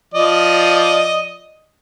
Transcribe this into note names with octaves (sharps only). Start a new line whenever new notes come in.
F3 D5 D#5